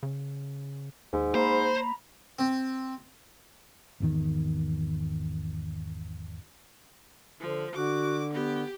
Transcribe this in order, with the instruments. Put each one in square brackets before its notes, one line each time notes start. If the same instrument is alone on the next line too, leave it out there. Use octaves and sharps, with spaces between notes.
[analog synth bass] C#3
[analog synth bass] D#2 [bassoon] G#2
[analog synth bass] A#3 [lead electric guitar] C5 [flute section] A#5 B5
[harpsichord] C4
[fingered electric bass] G#1 E2 D#3
[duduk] D3 [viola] F3
[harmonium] D3 [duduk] F#4 [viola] D6
[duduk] B3 [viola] G4